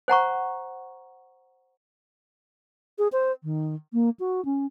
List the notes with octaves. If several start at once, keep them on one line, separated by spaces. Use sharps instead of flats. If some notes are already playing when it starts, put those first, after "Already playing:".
C5 F#5 A#5 C#6
G#4
C5
D#3
A#3
F#4
C#4